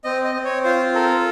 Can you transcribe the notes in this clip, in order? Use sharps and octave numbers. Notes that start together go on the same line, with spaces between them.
C4 D#5
D#5
C4
C#5
F4 C5
A4 A#4